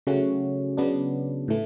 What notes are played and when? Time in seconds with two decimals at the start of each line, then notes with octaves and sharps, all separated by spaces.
0.07 C#3 F#3 A3 C#4 F#4
0.77 C#3 F#3 B3 D4
1.48 A2 E3 A3